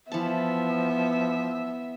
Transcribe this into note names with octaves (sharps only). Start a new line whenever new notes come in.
E3 F3 B3 E5 A5